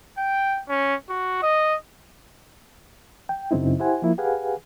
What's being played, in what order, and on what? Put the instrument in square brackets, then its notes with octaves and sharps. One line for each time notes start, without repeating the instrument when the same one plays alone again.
[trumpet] G5
C#4
F#4
D#5
[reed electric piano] G5
F#2 C#3 F#3 C4 D#4 E4
E4 G4 C5 F#5 G#5
F3 A#3 E4
G4 G#4 B4 F5 F#5 G#5